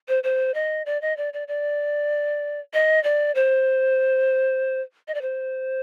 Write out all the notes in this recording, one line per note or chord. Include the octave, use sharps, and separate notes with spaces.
C5
C5
D#5
D5
D#5
D5
D5
D5
D#5
D5
C5
D#5
D5
C5